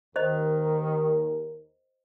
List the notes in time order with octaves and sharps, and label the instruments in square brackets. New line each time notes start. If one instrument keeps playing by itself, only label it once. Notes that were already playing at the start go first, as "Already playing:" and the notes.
[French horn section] D#2 A#4 [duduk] D#3 [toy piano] C5 D#5